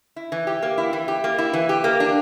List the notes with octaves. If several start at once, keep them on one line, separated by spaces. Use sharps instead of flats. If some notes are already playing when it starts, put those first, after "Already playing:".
E4
E3
G4
A#3
E4
E3
G4
A#3
E4
E3
G4
A#3
D4